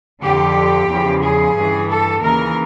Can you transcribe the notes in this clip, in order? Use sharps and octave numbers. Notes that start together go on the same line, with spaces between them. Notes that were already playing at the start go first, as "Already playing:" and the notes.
F2 D3 F3 G4
E2 C#3 F3
G#4
G2 E3
A4
D#2 C#3 E3 A#4